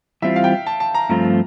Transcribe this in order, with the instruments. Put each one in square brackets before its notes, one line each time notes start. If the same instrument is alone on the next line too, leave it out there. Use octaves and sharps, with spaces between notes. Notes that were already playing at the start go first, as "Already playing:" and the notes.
[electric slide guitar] E3 G3 C4 F4 [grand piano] E5
[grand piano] F5
G5
A5
A5
A#5
[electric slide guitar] G2 F3 A3 C4 F4 [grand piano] A#5